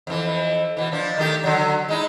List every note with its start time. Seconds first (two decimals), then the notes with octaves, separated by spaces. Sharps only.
0.07 F2 E3
0.77 B2 E3
0.92 F3 D4
1.18 D#3 A3 G4
1.44 D3 F#3
1.89 G#3 D#4 E4